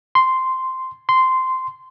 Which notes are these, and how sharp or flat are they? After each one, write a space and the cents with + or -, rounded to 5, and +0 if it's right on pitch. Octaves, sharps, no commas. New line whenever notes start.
C6 -5
C6 -10